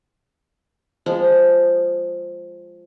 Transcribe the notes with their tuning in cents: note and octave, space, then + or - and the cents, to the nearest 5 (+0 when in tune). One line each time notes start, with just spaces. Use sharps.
F3 +0 G#3 -20